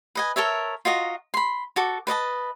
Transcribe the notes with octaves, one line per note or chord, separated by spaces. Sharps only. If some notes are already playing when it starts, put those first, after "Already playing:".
B4 D#5 G#5
A4 A#4 C#5 E5
F4 F#4 D#5 A#5
B5 C6
F#4 A4 D6
B4 D5 D#5 A5